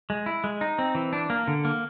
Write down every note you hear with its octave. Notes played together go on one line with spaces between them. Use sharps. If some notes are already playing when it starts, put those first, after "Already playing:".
G#3
E4
G#3
D#4
C4
E3
D4
A#3
D3
A#3